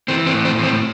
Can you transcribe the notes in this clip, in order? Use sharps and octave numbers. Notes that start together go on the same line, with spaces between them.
E3 C4
C4
A2
C4
A2
C4